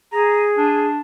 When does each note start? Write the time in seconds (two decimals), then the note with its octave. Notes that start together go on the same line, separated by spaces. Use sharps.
0.13 G#4 A#5
0.58 D4